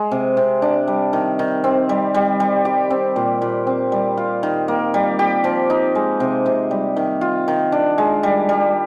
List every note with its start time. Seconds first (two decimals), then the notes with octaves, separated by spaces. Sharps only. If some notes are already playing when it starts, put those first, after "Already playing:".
Already playing: G#3
0.11 C3
0.37 C3
0.62 D4
0.88 G3
1.13 D#3
1.39 D#3
1.64 C4
1.89 G3
2.14 G3
2.40 G3
2.65 G4
2.90 C4
3.16 A#2
3.42 A#2
3.67 C4
3.92 G3
4.17 F4
4.43 D#3
4.68 A#3
4.94 G3
5.19 G4
5.44 F3
5.70 D#4
5.95 G#3
6.20 C3
6.46 C3
6.71 G3
6.96 D#3
7.21 F4
7.48 D#3
7.72 D4
7.98 G#3
8.23 G3
8.49 G3